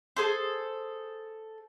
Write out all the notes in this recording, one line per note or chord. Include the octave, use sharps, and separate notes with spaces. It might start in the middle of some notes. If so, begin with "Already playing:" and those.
G#4 A4 C5